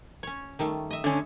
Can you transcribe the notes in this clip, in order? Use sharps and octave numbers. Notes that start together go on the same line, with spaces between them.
C#4 C#5
D#3 G3 A3
D#5 E5
D3 C#4